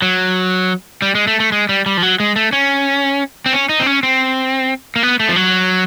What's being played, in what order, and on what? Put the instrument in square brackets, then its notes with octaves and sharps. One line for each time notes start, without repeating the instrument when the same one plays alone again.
[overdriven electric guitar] F#3
G3
G#3
A3
A3
G#3
G3
G3
F3
F#3
G#3
A3
C#4
C4
C#4
D#4
C4
C#4
C4
A#3
B3
A3
F3
F#3